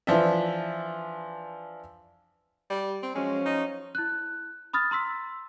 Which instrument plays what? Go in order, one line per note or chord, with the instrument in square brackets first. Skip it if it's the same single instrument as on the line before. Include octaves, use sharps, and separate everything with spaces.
[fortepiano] E3 F3 D4 E5
[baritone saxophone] G3
C4
[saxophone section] F3 F#3 C#4 [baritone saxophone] G#3
[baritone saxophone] D#4
[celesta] E4 F#6
B5 D#6 F6 A6
A#5 C6 E6 B6